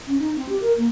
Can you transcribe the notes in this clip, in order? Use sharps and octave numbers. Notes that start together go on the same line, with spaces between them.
C#4
D#4
C4
G4
A#4
A#3